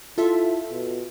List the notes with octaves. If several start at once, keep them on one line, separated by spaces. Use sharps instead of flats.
E4 F4 A4 E5
B2